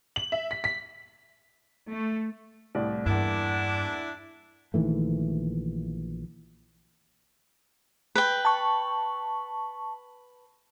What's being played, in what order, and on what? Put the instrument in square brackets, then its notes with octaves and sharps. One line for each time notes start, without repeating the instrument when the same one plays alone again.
[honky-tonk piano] F#7
E5
B6
B6
[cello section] A3
[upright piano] C2 A2 D5
[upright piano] E2 A#3 [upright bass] G2 [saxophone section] D4 E4
[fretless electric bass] A#1 D#3 E3 A3
[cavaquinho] B4 G5
[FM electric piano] A5 C#6